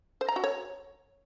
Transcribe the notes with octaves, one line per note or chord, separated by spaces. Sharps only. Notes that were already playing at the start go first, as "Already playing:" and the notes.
C5
A#5
F#4
C#5